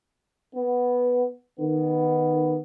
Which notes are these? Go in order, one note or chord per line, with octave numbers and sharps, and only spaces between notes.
B3
D#3 B3